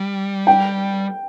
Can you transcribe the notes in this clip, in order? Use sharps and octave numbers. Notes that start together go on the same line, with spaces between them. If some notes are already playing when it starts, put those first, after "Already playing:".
Already playing: G3
G5